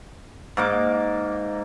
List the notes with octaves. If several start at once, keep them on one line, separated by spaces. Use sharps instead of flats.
G#2 A#3 D6